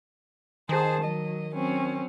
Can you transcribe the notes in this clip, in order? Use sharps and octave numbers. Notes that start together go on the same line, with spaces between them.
D#3 G#4 C5 A5
F#3 D#5
F#3 C4 C#4